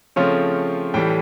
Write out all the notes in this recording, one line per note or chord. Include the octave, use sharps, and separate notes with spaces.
C#3 F3 A3 C4 F4 C#5
A2 E3 G3 G5